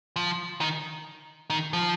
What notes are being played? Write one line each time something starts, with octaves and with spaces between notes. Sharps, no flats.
F3
D#3
D#3
F3